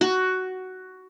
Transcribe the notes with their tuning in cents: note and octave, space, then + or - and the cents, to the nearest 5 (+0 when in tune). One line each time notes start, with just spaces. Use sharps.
F#4 +10